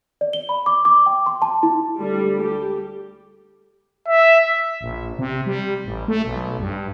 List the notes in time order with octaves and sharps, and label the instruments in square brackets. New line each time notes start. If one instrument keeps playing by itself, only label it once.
[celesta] D5
G7
B5
D6
D6
G5
C6
A5
E4
[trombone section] D2 A4 [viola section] G3
[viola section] G4
[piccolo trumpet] E5
[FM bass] A#1
C3
G3
A1
A3
B1
G2